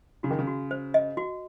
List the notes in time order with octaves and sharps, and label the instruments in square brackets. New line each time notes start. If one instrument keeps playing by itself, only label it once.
[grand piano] C#3 [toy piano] F#4
[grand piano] D#3
C#3
[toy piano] F#4
C5
D#5
F#4